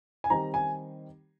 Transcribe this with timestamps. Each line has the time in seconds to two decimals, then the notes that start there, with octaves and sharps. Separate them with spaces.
0.24 G#5
0.30 D#3 G3 C4 D#4 A#5
0.54 G#5